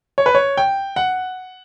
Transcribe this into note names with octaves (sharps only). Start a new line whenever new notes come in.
C#5
B4
C#5
G5
F#5